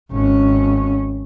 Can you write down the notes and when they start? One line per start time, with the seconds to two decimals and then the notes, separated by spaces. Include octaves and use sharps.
0.11 G#1 C#4